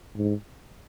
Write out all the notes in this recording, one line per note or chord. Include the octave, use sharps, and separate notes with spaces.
G#2